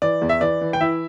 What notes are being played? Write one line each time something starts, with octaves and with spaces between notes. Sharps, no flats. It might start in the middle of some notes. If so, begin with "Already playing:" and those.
E3 D5
E2
E5
E3 D5
E3
G5
E3 E4 E5